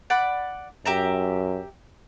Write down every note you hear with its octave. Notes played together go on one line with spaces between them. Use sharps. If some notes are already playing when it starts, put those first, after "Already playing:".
D5 F#5 B5
F#2 G4 E5 A#5